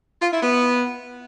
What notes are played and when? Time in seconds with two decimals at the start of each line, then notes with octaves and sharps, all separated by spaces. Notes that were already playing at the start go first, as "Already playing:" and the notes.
0.22 F4
0.32 E4
0.42 B3